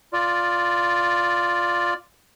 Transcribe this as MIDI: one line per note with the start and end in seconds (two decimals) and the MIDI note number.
0.13 1.94 65
0.13 1.94 74